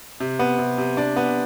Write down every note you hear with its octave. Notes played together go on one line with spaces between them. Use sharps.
C3
B3
C3
C3
D4
B3